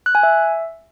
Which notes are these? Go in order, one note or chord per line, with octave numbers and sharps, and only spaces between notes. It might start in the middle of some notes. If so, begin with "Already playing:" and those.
F#6
G#5
E5